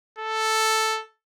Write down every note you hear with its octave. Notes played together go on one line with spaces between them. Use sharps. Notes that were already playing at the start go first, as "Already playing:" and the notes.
A4